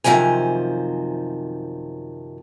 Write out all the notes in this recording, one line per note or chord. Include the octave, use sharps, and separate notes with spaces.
F#2 C3 D#3 F3 C5 G#5